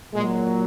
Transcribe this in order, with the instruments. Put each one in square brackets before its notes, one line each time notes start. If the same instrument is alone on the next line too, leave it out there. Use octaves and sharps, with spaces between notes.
[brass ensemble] A#2 F#3 G#3